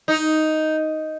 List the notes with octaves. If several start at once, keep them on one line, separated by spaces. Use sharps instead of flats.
D#4